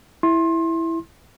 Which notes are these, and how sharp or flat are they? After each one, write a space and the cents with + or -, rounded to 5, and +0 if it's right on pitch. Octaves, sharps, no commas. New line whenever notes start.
E4 +0 C6 +25